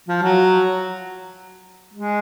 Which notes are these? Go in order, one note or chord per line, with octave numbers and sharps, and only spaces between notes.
F3
F#3
G#3